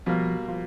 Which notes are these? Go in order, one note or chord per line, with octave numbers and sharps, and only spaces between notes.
B2 F3 G3 A#3
F3